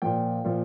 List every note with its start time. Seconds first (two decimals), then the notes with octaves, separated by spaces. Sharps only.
0.02 A#2 F3 G5
0.44 A#2 F3